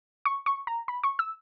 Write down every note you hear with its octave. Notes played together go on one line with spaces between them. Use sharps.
C#6
C#6
A#5
B5
C#6
E6